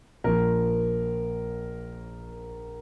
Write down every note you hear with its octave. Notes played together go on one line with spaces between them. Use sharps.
A#1 A#2 F3 A#4